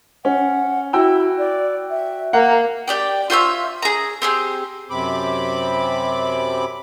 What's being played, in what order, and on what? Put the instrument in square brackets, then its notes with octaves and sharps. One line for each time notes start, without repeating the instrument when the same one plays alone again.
[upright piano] C#4 [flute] F#5
[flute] E4 [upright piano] F#4 G5 E6
[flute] D5
E5
[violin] A#3 [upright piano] F#5 [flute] A#5
[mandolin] G4 D5 G5
F4 C5 C#5 E5
G#4 A#5
C4 G4 G#4
[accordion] F#2 C3 C4 B5 D6